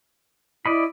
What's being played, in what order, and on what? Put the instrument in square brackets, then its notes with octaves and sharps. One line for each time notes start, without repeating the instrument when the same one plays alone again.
[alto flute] E4 [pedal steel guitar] D5 D#5 B5